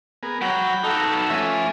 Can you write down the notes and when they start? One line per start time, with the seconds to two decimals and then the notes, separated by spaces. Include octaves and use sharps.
0.23 B3 G#4 A#4
0.42 F#3 F#5 G5 B5
0.84 D#4 F#4 A4
1.09 B4 A5
1.30 F3 A3 C#4 E5 G#5